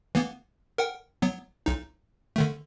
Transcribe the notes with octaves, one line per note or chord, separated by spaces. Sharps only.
E3 A#3 B3
A#4 F#5 G5
F#3 B3
B1 D#4
D3 D#3 A3